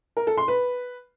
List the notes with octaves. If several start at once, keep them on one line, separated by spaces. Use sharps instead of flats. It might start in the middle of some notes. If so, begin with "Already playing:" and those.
A#4
A4
C6
B4